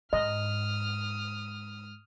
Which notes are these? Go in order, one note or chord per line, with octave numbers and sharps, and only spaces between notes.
G#2 D#5 D#6 F6